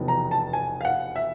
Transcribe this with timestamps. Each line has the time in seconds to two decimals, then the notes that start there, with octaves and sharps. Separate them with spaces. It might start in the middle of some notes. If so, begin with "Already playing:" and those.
Already playing: F1 E2 B2
0.08 A#5
0.31 A5
0.53 G#5
0.81 F5
0.85 F#5
1.16 E5